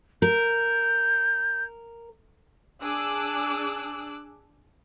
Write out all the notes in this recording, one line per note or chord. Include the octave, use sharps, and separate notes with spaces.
A#4 G6
D4 G#4 D6 E6 F#6